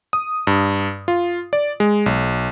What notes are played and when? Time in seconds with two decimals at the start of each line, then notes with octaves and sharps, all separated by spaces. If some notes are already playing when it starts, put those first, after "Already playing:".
0.13 D#6
0.47 G2
1.08 F4
1.53 D5
1.80 G#3
2.06 B1